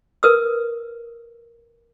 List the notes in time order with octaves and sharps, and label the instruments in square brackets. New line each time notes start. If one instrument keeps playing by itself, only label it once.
[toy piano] A#4 B4 D#6 E6